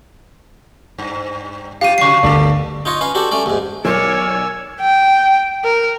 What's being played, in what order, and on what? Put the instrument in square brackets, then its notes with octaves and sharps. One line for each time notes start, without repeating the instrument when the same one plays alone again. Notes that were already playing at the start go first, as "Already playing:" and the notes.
[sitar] G2
[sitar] F2 F4 G4 [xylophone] F5 D#7
[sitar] C3 F#3 [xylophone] C#6 C7
[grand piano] G1 D2 [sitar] A#3 A4 D5
[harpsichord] D#4 F4 C#5 D#5
C#4 B4 F5
D4 F#4 G4 A4
A3 C#4 A4 D5
D#2 G#2
[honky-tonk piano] B1 [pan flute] A#4 [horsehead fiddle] C#5 D5 [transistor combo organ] G#5 E6
[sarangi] G5
A#4